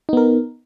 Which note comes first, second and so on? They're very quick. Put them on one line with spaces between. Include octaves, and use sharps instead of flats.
D#4 B3 A#4